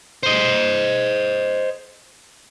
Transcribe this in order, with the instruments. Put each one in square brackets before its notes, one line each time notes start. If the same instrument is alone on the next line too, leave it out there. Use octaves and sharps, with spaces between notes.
[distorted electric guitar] C5 D#5